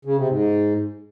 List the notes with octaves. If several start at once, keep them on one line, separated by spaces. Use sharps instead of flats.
C#3
C3
G#2